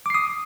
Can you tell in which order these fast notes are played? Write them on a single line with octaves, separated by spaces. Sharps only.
D6 C7 D#6